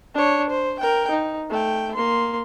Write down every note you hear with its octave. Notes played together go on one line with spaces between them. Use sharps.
D4 C#5
C5
A#4 G5
D#4
A3 G5
A#3 C6